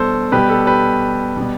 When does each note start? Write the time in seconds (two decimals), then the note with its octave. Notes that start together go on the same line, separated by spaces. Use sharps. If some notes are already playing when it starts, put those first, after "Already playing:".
Already playing: B2 G3 A4 C5
0.32 B2 G3 G4 B4
0.49 A4
0.67 G4 B4
1.37 B2 G3